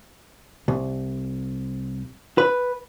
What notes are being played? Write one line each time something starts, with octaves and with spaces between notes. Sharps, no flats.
C2
B4